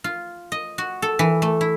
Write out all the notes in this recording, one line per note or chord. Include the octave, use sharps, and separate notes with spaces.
F4
D#5
F#4
A4
E3
A3
E4